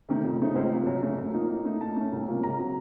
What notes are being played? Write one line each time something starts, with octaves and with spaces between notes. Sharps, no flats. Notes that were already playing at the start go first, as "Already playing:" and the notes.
C3 D#3 A3
F2
C#3 A3 C4 D#4
C#2 C5
C3 F3 A#3
F#2
C#3 A3 C#4
F#2
F3 A#3 D#4
A2
A3 D#4
A#2 A5
A3 C#4
C2
C3 F3 A#3 C#4
C#2 A#5
C3 F#3